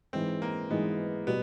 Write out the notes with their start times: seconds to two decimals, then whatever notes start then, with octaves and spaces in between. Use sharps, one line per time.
0.13 G#2 E3 G#3 C4
0.42 A#3
0.70 G#2 E3 G#3 B3
1.27 B2 G3 B3